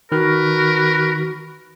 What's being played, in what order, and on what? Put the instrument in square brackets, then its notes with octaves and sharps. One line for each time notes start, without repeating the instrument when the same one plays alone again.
[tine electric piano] D#3 F6 [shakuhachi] F#4 [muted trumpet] A#4 [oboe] B4